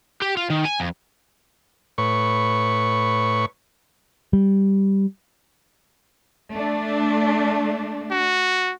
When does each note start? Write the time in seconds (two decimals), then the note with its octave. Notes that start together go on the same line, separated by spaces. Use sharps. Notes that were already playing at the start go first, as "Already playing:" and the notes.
0.22 G4
0.37 F4
0.50 D#3
0.65 G#5
0.80 F2
1.98 A2 B4 C#5 C#6
4.33 G3
6.52 A3 D4
8.11 F#4